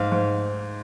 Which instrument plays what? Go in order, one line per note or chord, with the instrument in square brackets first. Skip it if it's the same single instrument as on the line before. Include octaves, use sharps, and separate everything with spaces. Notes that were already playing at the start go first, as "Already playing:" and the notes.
Already playing: [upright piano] G#2 [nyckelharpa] F5
[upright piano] G#2